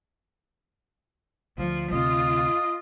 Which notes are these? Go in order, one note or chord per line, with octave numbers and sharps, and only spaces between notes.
D2 F3
D2 C3 F4 D#5